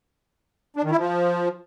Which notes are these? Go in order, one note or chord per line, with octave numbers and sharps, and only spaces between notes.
D4
D#3
E4
F3